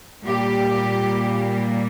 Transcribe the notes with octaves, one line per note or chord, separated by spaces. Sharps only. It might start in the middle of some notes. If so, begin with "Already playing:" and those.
A#2 G3 A#3 G4